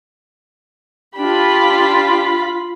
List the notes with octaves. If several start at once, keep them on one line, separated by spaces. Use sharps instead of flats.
D4 F4 G4 B5